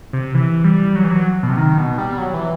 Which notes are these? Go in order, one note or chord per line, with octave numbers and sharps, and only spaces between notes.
C3
E3
G3
F#3
E3
F#3
B2
C3
D#3
B2
G3
F#3
E3